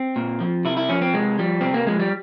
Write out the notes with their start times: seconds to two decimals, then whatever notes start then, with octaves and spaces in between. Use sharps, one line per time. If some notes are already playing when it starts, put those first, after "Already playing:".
Already playing: C4
0.16 A#2
0.40 F3
0.65 C3 E4
0.77 E4
0.89 F3 C#4
1.02 C4
1.14 C3 G#3
1.39 F3 G3
1.61 C3 C4
1.74 A#3
1.87 F3 G#3
2.00 G3